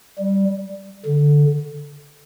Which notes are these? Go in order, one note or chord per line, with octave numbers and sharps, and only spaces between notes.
G3
D3